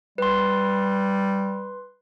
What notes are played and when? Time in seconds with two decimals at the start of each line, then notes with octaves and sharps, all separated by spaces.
0.18 G3 B4 C6